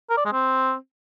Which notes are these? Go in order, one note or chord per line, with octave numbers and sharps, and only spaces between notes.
A#4
D5
G#3
C4